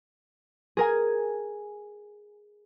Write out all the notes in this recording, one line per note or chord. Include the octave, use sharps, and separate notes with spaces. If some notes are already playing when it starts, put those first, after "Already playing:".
G#4 A#4 G#5